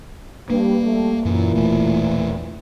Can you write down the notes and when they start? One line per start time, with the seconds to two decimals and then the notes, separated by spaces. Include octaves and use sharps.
0.50 G2 A#3 B4
0.84 G3 A3
1.25 F#2 A#2 E3
1.55 E1 A3